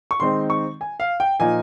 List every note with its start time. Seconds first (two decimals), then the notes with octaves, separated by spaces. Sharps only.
0.11 C#6
0.20 D#3 G#3 C4 D#4 C6
0.50 C#6
0.81 G#5
1.00 F5
1.20 G5
1.40 A#2 F3 A#3 D#4 G#5